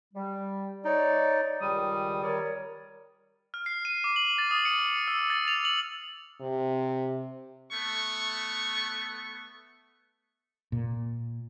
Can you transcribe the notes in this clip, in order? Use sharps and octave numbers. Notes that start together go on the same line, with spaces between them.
G3
D#4 C#5 D5
C#2 D#3 G3 D#6
A#4 C#5 D5
F6
C7
D#7
D6
F#7
A6
D#6
C#7
E6
A6
F7
F#7
C3
A3 B3 C#6
A#2